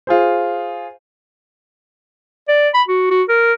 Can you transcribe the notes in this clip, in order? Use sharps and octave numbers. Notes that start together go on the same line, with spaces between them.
F4 G#4 C5
D5
B5
F#4
F#4
A#4